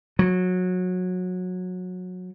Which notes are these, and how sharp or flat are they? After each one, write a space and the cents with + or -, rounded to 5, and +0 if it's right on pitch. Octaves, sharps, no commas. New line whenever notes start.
F#3 -20